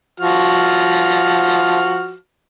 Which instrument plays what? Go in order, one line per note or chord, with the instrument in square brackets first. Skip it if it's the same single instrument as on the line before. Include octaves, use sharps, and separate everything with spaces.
[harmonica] F3 F#4 F6